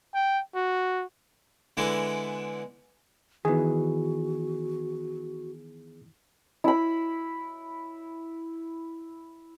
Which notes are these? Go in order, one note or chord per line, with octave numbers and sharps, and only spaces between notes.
G5
F#4
D3 E3 G#3 B3 E4
D#3 E3 B3 F#4 G#4
E4 B5